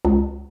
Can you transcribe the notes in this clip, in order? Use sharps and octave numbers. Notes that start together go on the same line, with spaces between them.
C#2